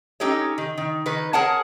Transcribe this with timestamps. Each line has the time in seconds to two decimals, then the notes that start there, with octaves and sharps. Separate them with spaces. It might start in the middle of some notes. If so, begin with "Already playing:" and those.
0.20 C#4 D#4 G4 A4 C#5
0.58 D#3
0.77 D#3
1.06 D#3 B4
1.33 G#4 A#4 C#5 F#5 G#5 A5